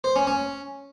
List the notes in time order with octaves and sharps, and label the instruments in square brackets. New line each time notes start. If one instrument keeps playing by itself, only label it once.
[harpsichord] C5
C#4
C#4